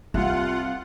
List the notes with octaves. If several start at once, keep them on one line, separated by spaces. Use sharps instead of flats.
C2 C4 F4 F#5